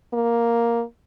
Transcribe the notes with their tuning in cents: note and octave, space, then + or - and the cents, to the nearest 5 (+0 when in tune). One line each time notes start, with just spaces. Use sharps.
A#3 +5